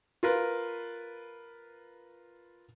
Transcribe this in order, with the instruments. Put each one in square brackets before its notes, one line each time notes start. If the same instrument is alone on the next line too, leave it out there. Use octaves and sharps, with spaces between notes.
[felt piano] F4 A#4 B4